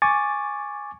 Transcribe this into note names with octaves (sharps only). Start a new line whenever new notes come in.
G#5 C#6 D6 A6